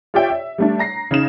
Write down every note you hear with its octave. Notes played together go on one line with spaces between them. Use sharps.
F4 G4 C#5 D5 E5 G5
E5
G3 A3 D4
A#5 A#6 C7
C#3 D#4 E7